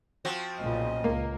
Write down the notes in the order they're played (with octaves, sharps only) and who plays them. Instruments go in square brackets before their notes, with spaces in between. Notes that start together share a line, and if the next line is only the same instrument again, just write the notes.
[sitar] F3 C4 F#4
[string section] B1 A#2 C#3 [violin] D#5
[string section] C#2 A#4 [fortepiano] A#3